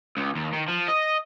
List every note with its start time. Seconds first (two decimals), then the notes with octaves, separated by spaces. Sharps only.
0.17 C#2
0.36 D#2
0.53 D#3
0.69 F3
0.89 D#5